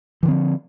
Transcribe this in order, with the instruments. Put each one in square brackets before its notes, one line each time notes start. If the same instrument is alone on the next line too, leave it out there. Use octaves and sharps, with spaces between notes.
[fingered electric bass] E3
D3
C4
F3